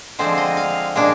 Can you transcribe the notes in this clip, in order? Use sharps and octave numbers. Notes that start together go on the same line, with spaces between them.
D3 F3 G#3 C4 C5
D#5
F5
A#2 G#3 D4